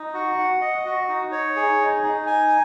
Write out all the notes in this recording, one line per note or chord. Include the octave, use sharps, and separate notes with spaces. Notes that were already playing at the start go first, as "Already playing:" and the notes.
Already playing: D#4
F#4
F#5
D#5
F#4
D#4
C#5
G#4
D#4
D#4
G#5